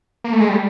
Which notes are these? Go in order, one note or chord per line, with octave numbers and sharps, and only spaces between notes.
A#3
A3
G#3
G3